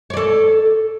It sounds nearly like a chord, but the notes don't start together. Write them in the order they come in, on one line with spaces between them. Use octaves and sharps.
C#5 D5 A4